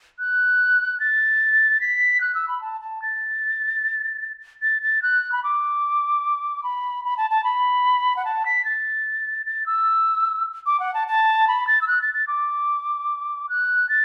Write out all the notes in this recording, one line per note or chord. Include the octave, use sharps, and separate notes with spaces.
F#6
A6
B6
F#6
E6
B5
A5
A5
A6
A6
A6
F#6
B5
D6
B5
B5
A5
A5
B5
F#5
A5
B6
A6
A6
E6
D6
F#5
A5
A5
B5
A6
E6
F#6
A6
A6
D6
F#6
A6